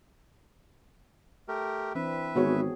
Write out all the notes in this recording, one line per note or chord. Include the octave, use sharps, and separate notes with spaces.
A3 G4 A#4
E3 C4 D4 B4 E5
G#1 B3 F#4 G#4 C#5